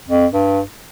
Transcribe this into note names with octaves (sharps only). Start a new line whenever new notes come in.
F2
G2